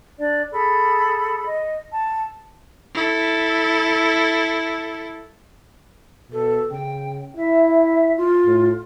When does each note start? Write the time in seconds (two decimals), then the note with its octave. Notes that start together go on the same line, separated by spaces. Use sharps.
0.17 D4 D5
0.51 G#4 A4 B5
1.46 D#5
1.92 A5
2.95 E4 A4
6.32 B2 A4
6.71 C#3 G5
7.37 E4 E5
8.17 F4
8.46 A2